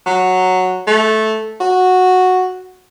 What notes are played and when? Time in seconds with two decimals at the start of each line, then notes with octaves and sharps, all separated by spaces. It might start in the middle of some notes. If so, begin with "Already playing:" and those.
0.06 F#3
0.87 A3
1.60 F#4